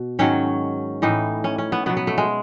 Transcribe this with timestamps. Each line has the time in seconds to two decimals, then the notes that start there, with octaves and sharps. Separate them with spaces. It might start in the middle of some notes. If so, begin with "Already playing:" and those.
Already playing: B2
0.19 G#2 D#3 F#3 C#4
1.02 A2 E3 D#4
1.44 C#4
1.58 C#4
1.72 B3
1.86 B2 F#3 B3
1.97 B3
2.07 A3
2.18 G#3